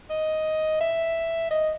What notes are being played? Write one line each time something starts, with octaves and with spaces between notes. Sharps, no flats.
D#5
E5
D#5